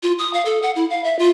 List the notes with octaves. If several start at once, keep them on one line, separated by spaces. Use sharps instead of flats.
F4
D#6
F5
A4
F#5
E4
F5
E5
F4